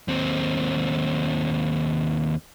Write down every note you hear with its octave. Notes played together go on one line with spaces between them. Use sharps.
D#2 C4